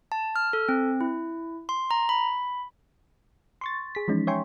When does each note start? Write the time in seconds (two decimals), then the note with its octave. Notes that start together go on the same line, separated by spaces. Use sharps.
0.12 A5
0.36 F6
0.53 A4
0.69 C4
1.01 E4
1.69 C6
1.91 A#5
2.09 B5
3.61 C6 C#6 A6
3.95 G#4 B6
4.08 E3 F3 G#3 C#4 D#4
4.27 C#5 E5 G5 G#5 C6 C#6